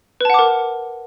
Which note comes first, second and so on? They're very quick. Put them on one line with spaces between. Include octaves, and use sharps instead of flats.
B4 A5 F#5 D6 A#4